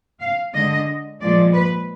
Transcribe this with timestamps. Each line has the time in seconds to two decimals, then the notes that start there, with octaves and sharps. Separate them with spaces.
0.20 F5
0.54 D3 G#3 D#5
1.20 A#2 F3 G#3 D5
1.53 B4